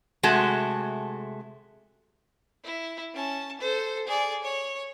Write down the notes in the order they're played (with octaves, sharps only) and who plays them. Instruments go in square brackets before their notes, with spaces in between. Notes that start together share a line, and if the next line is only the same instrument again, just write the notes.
[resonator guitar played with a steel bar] C3 G#3 A3 F#4 A5
[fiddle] E4
C#4 A5
A4 C5
G#4 D5
C#5